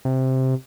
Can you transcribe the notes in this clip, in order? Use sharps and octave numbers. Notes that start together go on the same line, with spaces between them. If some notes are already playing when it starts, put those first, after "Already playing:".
C3